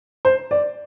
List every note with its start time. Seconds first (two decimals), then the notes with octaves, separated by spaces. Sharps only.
0.25 C5
0.51 D5